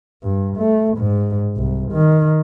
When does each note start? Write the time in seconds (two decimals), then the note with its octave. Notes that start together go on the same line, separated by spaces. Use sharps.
0.23 G2
0.57 A3
0.98 G#2
1.57 C2
1.92 D#3